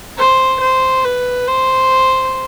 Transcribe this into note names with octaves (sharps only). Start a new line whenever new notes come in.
C5
C5
B4
C5